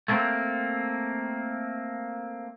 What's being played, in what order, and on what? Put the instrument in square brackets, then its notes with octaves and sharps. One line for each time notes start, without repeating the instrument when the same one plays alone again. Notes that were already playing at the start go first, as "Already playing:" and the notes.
[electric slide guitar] A3 A#3 C4